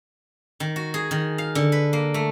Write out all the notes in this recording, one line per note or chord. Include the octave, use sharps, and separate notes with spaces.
D#3
F#4
G#4
D#3
F5
D3
B4
A#3
A3